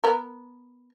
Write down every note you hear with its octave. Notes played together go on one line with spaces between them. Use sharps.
B3 A#4